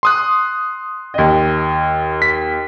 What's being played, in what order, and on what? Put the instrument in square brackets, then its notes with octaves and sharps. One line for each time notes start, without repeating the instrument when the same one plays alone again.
[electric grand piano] C6 D#6 F#6
[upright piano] D#2 D#5
[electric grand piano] B6